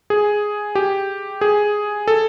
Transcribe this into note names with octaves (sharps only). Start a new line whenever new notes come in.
G#4
G4
G#4
A4